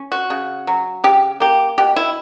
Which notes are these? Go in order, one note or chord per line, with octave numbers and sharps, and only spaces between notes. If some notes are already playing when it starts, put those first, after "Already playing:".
Already playing: C#4
F#4
C#3
F#3
C#3 G4
A#3 G4
B2 G4
E4